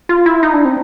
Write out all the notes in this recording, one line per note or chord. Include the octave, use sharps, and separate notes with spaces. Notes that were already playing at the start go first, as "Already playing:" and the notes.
F4
E4
D#4
D4
C4